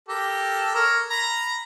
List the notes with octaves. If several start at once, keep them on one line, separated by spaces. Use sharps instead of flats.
G4 A4 A#4
A#4 C#5
A#5 B5